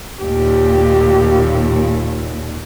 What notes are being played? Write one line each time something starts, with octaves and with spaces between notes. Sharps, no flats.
D#2 A#2 G4